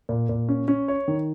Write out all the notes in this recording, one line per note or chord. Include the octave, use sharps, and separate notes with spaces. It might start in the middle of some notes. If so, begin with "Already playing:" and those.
A#2
A#2
C#4
C#4
C#5
D#3